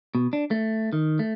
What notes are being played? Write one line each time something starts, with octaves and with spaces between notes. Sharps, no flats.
B2
D4
A3
D#3
A3